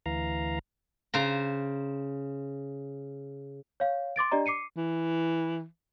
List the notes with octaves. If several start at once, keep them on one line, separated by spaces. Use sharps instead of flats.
D2 E3 F5 A#5
C#3 C5 A#5
C#5 F5
C6 D6 A6 D7
D4 G4 D5 D#5 A#5
D6 C7 C#7 D#7
E3